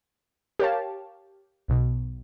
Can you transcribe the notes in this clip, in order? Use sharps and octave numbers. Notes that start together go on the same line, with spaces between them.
G4 A#4 C#5 F5 A5
B1 B2